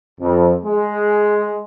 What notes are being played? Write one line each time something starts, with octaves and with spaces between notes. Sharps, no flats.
F2
G#3